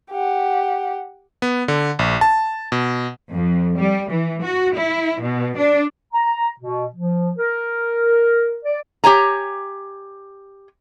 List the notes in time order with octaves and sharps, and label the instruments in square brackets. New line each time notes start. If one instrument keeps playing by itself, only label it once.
[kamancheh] G4 F#5
[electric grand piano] B3
D3
A#1
A5
B2
[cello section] F2
G3
E3
F#4
E4
B2
D4
[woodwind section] A#5
B2
F3
A#4
D5
[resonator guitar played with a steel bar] G4 C#5 G#5 A#5